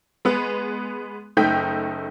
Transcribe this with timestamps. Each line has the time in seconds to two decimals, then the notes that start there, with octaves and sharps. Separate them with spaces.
0.25 G#3 B3
1.37 F#1 A3 D#4 G5 G6 B6